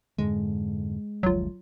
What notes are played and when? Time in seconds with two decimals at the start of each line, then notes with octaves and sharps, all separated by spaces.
0.18 F2 G#2 D3 G#3
1.23 F#1 D2 F3 F#3 F4